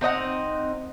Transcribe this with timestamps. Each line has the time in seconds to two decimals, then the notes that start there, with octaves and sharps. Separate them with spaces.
0.01 C4 D#4 D#5 F#5